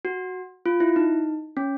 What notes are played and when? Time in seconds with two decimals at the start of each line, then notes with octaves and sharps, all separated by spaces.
0.05 F#4
0.66 F4
0.80 E4
0.96 D#4
1.57 C#4